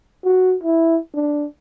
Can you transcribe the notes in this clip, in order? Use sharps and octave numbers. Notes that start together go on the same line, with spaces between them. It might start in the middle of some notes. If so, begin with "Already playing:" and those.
F#4
E4
D4